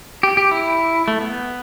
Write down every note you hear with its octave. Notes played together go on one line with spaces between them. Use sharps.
G4
G4
E4
A3
B3